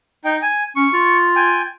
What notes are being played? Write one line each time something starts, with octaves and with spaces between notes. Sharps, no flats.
D#4 G5
G#5
C#4 C#6
F4
G5 G#5